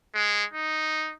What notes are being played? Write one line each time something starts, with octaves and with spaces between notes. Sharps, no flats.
G#3
D#4